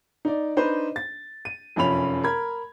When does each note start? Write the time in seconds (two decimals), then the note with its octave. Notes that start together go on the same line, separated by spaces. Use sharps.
0.25 D#4 D5
0.57 D4 D#4 B4 C5
0.96 A6
1.45 D#7
1.76 F1 F#2 F3 C#4 B5 F7
2.24 A#4 B5 G#6